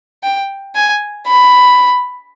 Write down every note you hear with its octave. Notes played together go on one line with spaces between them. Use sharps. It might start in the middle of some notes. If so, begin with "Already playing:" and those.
G5
G#5
B5